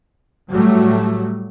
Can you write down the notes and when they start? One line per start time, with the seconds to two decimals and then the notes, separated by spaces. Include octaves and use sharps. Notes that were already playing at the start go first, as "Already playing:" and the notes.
0.49 A2 F#3 G3 A3